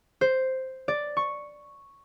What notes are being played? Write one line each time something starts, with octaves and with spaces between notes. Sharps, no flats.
C5
D5
C#6